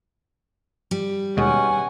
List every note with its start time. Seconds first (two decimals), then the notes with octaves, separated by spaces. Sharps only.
0.91 G3
1.37 D#2 B2 G#3 C#4 F#5 G#5